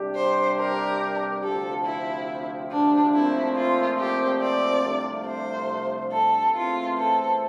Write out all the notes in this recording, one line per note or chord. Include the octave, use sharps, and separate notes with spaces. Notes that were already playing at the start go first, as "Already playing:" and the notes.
Already playing: C3 G3 D4 G4
C5
A#4
D2 C3 F3 C4 G4 A4
E4
D4
A#2 F3 A3 C4 E4
F4
G4
D5
C2 C3 F3 A3 D4
C5
A4
E2 E3 A3 C4 F4
A4